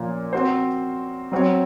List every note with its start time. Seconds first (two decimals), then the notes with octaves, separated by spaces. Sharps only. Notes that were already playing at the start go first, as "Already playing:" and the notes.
Already playing: A#2 F3 A#3 C#4
0.33 C4 F#4 C5
1.32 F#3 C4 F#4 C#5